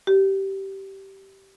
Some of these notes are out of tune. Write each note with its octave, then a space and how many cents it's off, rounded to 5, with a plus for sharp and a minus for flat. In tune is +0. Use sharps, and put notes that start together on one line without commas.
G4 -15